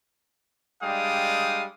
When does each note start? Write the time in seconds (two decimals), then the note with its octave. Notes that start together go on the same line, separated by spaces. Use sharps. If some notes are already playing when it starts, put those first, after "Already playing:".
0.83 G3 G#3 D4 F5 G5 D#6